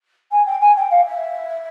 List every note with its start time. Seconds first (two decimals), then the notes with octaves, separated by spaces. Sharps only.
0.31 G#5
0.45 G5
0.60 G#5
0.76 G5
0.90 F5
1.05 E5